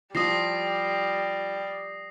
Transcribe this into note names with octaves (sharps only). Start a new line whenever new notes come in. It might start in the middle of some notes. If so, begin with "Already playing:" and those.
F3 G3 F4 D#6 A#6 C7